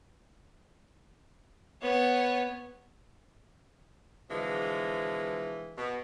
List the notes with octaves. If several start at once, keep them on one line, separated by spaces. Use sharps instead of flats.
B3 C#5
B2 D3 E3 F3 G#3
B2